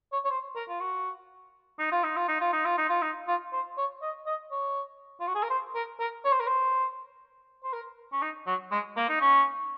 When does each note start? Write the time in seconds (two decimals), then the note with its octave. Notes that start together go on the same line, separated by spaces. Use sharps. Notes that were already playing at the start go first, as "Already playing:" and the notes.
0.12 C#5
0.25 C#5
0.30 C5
0.56 A#4
0.69 F4
0.80 F#4
1.79 D#4
1.92 F4
2.04 D#4
2.16 F4
2.28 D#4
2.41 F4
2.53 D#4
2.65 F4
2.78 D#4
2.89 F4
3.02 D#4
3.28 F4
3.53 C5
3.78 C#5
4.02 D#5
4.27 D#5
4.51 C#5
5.20 F4
5.27 F#4
5.35 G#4
5.43 A#4
5.50 C5
5.75 A#4
6.00 A#4
6.24 C#5
6.32 C5
6.40 A#4
6.47 C5
7.64 C5
7.73 A#4
8.12 C#4
8.22 D#4
8.47 F#3
8.71 G#3
8.97 A#3
9.09 D#4
9.21 C#4